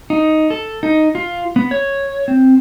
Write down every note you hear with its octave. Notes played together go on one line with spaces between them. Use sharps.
D#4
A4
D#4
F4
B3
C#5
C4